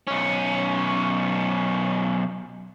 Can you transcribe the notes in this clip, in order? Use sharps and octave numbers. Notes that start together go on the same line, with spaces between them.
B1 C#4